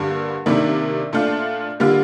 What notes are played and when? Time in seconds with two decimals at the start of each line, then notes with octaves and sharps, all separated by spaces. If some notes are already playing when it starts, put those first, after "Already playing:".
Already playing: G2 D3 G3 A#3
0.46 C3 D#3 A#3 D4
1.13 A#2 A3 D4 F4
1.80 D3 G3 A#3 D4 F4